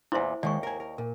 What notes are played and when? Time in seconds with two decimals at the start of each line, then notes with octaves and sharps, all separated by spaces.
0.12 E2 A#2 E4 C5 E5
0.43 D#2 D#3 G#3 D5 C#6
0.63 A#4 G#5
0.80 A#4
0.98 A#2 A#4